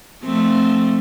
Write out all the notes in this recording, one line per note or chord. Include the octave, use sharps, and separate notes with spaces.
F3 A3 C4